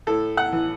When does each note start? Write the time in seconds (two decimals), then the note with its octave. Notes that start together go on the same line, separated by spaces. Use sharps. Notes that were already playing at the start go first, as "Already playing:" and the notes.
0.07 A2 A4
0.37 F#5
0.52 E3